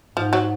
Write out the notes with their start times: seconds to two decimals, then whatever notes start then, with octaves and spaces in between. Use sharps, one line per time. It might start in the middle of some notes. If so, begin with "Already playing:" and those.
0.16 G#2 F3
0.33 F#3